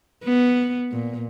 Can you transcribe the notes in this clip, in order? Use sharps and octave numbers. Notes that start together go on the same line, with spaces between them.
B3
A#2